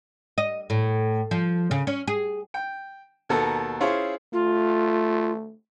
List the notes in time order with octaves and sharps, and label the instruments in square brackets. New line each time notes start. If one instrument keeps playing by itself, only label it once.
[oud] D#5
A2
F3
C#3
C#4
G#4
[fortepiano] G5
D#2 B2 B3 A4 A#4 E6
C#4 E4 F4 G#4 C5 C#5
[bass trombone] A3 [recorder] F4